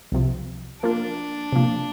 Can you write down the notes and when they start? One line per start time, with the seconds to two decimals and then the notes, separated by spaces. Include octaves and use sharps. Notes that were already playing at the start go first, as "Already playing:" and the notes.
0.12 C2 C3 F3
0.83 F3 A#3 D4 F4
1.53 C3 F3 A#3